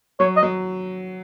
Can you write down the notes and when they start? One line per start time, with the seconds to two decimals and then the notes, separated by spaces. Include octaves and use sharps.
0.20 F#3 C#5
0.37 D#5
0.43 F#3